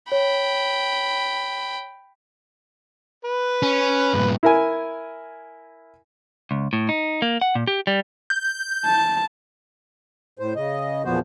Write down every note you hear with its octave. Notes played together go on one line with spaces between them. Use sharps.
C#5 G5 B5
B4
C#4
G2 A#2
E4 A#4 G#5
C#2
A2
D#4
A#3
F#5
A#2
G4
G3
G6
A5
A2 C5
C#3 D#5
E2 A#2 F3 B3 F#4 C5